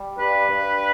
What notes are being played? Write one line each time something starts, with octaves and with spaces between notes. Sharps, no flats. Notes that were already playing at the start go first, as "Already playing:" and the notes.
Already playing: G3
G2 B4
G2